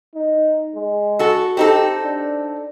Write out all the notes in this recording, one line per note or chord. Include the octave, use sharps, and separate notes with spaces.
D#4
G#3
F#4 A4
C4 D#4 G4 A4
D4